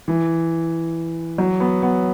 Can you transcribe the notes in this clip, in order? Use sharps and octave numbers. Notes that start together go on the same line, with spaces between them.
E3
F#3
B3
B3